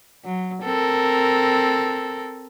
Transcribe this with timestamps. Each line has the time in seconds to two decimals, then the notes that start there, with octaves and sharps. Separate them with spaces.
0.25 F#3
0.63 C4 A4 A#4